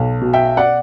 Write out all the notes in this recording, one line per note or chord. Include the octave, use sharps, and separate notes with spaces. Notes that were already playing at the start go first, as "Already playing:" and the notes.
Already playing: B1
B2
E5 G5
D5 F#5